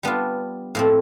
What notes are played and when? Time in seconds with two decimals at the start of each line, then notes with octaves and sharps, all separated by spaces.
0.03 G3 B3 D4 F4
0.75 A2 F3 C4